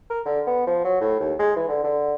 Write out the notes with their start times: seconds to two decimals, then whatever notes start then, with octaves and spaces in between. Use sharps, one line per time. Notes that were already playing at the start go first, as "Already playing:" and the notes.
0.10 A#4
0.25 D3
0.47 B3
0.67 F3
0.84 F#3
1.01 A2
1.20 D#2
1.39 G#3
1.56 E3
1.68 D3
1.84 D3